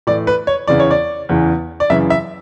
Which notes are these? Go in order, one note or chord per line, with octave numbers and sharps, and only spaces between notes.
A2 E3 D5
B4
C#5
E2 C#3 E3 D5
C#5
D5
E2 C#3 E3
D5
F#2 C#3 E3 E5
E5